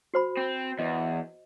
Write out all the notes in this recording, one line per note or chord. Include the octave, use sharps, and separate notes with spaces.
F#4 C5 B5
C4
E2 D#5